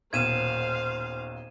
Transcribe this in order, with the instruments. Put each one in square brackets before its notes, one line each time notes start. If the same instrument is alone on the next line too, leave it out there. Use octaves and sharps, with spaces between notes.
[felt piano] D#1 B1 [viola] C5 F5 [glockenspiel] G#6 D#7 E7